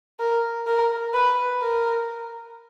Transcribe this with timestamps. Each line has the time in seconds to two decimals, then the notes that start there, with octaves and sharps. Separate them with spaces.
0.20 A#4
0.67 A#4
1.14 B4
1.62 A#4